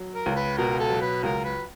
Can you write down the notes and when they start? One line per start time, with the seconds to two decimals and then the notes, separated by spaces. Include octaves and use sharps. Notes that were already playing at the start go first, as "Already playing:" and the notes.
Already playing: F#3
0.14 A#4
0.26 C#2
0.36 B4
0.58 B2 A#4
0.79 A4
0.90 F#3
1.02 B4
1.23 C#2 A#4
1.44 B4